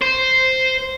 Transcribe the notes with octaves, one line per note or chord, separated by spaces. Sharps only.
C5